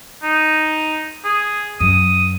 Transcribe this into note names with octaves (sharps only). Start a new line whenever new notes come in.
D#4
G#4
F#2 D#6